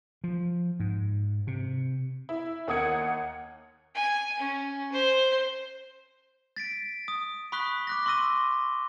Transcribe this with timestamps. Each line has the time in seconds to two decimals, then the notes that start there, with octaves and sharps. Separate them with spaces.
0.24 F3
0.80 G#2
1.47 C3
2.29 E4
2.67 D#2 A#3 F#5 D#6 G#6 C#7
3.95 G#5
4.39 C#4
4.92 C5
6.56 A6 B6 D7
7.08 D#6
7.52 B5 C#6 D#6 F#6 B6 G7
7.87 D6 F#6 A#6
8.06 C6 C#6 E6 A#6 D#7 G7